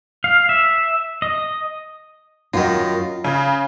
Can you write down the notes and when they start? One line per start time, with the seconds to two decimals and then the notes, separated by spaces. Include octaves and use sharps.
0.24 F5
0.49 E5
1.22 D#5
2.54 F#2 D#3 F4
3.24 C#3